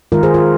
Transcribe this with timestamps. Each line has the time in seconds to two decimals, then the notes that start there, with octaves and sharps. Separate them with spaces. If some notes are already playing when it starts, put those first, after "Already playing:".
0.12 D#3 G#3 F4 A#4
0.23 G#4 C5
0.34 F4 A#4